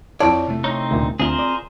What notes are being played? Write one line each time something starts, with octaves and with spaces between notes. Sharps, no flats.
F2 F3 E4 F4 C#5 D5 A5
C3 A3
C4 D#4 C#5
D2 A#2
D2 C4 F4 G#4 A#4 C5
D5